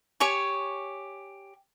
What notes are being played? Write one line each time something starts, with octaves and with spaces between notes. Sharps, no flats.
G4 C#5 G#5 C#6